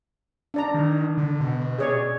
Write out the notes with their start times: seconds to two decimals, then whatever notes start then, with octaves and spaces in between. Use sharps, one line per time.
0.54 D4 D5 A#5
0.74 D#3
1.17 D3
1.40 B2
1.78 G#4 C#5 D5